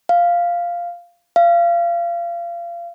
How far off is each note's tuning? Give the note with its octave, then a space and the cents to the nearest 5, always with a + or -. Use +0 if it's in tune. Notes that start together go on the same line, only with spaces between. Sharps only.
F5 -5
F5 -30